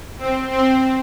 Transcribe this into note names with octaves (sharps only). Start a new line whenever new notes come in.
C4
C4